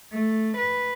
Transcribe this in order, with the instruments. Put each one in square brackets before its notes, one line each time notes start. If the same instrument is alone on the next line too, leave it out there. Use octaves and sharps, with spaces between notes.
[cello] A3
B4